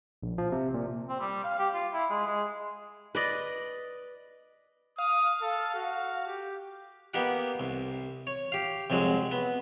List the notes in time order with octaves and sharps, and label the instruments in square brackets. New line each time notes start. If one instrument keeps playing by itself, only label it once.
[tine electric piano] A#1
F3
C3
A#2
[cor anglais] C4
G3
F5
G4
F4
E4
G#3
G#3
[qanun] B4 D5 D#5
[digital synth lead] F5 [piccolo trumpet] D#6
[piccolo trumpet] A4
F#4
G4
[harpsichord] A#3 B3 D#4 G4 F#5
C2
C#5
G4 F5
C2 F2 F#3 G#3
B3